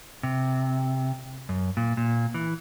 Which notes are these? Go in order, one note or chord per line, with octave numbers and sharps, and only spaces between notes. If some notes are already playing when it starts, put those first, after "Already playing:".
C3
F#2
A#2
A#2
E3